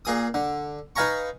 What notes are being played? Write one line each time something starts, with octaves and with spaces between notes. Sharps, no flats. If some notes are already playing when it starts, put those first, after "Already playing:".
A#2 G#4 D#6
D3
D#4 B4 F5 G#5 A#5 C#6